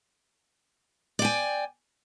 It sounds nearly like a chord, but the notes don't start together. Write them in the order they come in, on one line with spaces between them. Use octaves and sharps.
D5 G5 G#5